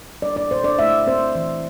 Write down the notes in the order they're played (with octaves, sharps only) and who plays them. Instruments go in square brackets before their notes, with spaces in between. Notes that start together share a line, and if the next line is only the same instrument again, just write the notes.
[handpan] G3 D5
D5
A#2 C5
D5
A3 E5
C4 C5
E3